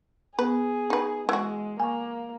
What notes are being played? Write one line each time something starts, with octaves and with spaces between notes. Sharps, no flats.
B3 G#4 B4
D#4 B4
E3 G#3 F#4
A#3 G#5 C#6